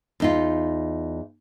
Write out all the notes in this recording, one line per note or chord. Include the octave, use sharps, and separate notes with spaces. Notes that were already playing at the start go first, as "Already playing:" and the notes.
E2 D#4 F4